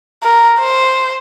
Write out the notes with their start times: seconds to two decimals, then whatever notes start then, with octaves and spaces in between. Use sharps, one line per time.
0.23 A#4
0.60 C5